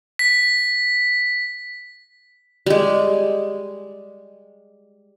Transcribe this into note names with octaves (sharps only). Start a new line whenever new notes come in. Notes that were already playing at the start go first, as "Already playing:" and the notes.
B6
G3 G#3